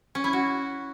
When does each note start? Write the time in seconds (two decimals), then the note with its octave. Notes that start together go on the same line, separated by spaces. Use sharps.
0.15 C#4
0.24 E4
0.33 F#4